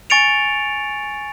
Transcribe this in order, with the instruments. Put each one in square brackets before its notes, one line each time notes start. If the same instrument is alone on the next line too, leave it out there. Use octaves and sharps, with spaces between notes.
[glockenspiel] G#5 C#6 A6 C#7 D7 F7